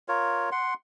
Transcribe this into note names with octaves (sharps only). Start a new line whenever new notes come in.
F4 A#4 C#5
F#5 C6